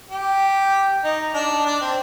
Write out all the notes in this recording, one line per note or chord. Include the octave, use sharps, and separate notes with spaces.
G4
D#4
D4
D4
C4